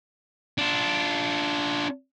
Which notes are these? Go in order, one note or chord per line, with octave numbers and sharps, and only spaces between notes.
D4 F4